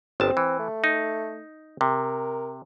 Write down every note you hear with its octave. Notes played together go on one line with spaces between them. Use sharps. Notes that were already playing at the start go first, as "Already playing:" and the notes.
G1 C4 A5
E3
A3
D#4
C3 A#4